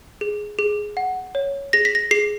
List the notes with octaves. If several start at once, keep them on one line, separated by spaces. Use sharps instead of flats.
G#4
G#4
F#5
C#5
G#4 A#6
B6
A#6
G#4 C7